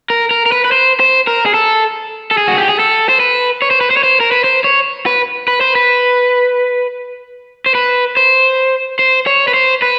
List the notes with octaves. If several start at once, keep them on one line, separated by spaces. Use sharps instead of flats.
A#4
A#4
A#4
B4
B4
C5
C5
A#4
G#4
A4
A4
G#4
F#4
G4
G#4
A4
C5
B4
C#5
C5
B4
C5
C#5
C5
A#4
B4
C5
C#5
B4
B4
C5
B4
C5
B4
C5
C5
C#5
B4
C5
B4